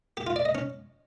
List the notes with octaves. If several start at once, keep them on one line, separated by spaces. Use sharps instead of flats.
G4
F4
D5
D#5
C#4